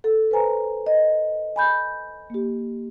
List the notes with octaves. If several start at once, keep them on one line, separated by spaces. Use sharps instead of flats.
A4
B4 C5 G#5 A#5
D#5
G#5 B5 G6
A#3 G4